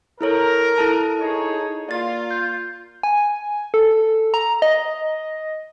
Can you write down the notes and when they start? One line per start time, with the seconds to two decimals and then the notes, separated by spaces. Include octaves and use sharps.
0.21 E4 A4 A#4 C#5
0.78 E4 A4 A5
1.20 D#4 G#4 C#5
1.89 A#3 F4 D5 A6
2.31 G6
3.03 G#5
3.74 A4
4.34 A#5
4.62 D#5